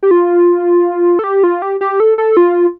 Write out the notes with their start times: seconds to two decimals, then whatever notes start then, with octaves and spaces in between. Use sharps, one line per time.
0.03 G4
0.11 F4
1.19 A4
1.24 G4
1.43 F4
1.62 G4
1.81 G4
2.00 A4
2.18 A4
2.37 F4